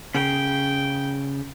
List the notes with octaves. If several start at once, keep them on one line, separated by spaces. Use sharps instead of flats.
C#3 G5